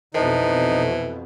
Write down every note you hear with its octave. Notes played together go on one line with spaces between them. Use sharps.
F2 B2 E3 D#4 A4 C5 A5